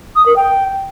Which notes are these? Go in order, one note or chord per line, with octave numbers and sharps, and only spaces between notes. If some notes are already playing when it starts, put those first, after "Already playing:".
D#6
A#4
G5